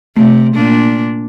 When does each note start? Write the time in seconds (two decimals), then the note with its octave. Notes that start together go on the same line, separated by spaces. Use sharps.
0.17 C3 A3
0.53 A#2 D4